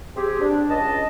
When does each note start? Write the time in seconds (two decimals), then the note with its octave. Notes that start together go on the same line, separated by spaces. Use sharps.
0.16 C4 G4 G#4
0.41 D4
0.70 C#2 D#5 A5